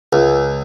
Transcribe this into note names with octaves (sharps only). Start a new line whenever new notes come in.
C#2